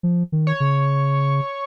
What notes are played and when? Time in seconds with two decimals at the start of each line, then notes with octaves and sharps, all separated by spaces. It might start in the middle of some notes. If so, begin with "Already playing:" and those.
0.03 F3
0.32 D#3
0.47 C#5
0.60 C#3